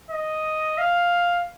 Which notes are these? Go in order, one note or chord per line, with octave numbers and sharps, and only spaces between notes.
D#5
F5